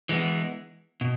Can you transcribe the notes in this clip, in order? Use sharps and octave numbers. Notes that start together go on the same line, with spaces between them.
E3 G#3 B3
B2